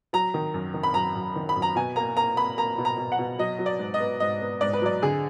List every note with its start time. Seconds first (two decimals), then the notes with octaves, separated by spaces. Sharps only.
0.13 F#3 A#5
0.34 D#3
0.54 F#2
0.74 D#3
0.83 B5
0.94 F#2 A#5
1.15 F#2
1.36 D#3
1.49 B5
1.56 F#2
1.62 A#5
1.76 B2 G#5
1.96 A#3 A#5
2.17 A#3 A#5
2.37 A#3 B5
2.58 A#3 A#5
2.78 B2
2.85 A#5
2.98 B2
3.12 F#5
3.19 B2
3.39 F#3 D#5
3.59 F#3
3.66 D5
3.79 G#2
3.94 D#5
4.00 B3
4.20 G#2 D#5
4.41 B3
4.61 G#2 D5
4.73 B4
4.82 F#3 D5
5.02 D3 G#4